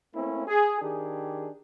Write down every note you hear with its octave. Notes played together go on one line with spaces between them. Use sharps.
A3 A#3 C4 C#4 E4
G#4
D#3 D4 G4 G#4